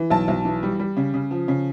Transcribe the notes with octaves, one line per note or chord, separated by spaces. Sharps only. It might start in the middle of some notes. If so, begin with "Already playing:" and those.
Already playing: E3
B1 A5
B1
E3
G3
G3
C#3
C#3
F3
C#3